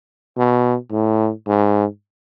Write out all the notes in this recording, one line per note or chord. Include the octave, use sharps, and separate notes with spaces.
B2
A2
G#2